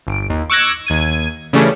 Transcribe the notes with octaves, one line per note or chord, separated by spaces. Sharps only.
G1 D7
D#2
C#6 D6 E6 F#6 G#6 A#6
D#2 G#6 D#7
C#3 E3 G3 A3 C#4 D4